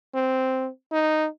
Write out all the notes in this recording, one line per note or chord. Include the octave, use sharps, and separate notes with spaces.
C4
D#4